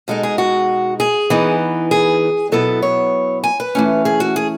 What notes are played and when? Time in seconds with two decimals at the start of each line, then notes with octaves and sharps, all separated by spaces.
0.08 B2 G#3 D#4 A4
0.23 G#4
0.38 F#4
1.00 G#4
1.30 E3 B3 D#4
1.91 G#4
2.52 B2 F#3 B3 E4 A4
2.82 C#5
3.44 G#5
3.60 B4
3.75 E3 A3 C#4
4.05 G#4
4.20 F#4
4.36 G#4